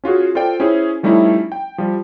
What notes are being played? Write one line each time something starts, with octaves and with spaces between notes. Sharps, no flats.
C#4 F4 F#4 G#4
F4 A4 C5 D5 G5
C#4 E4 G#4 C5
F3 G3 A3 C#4 D#4 E4
G5
F3 G3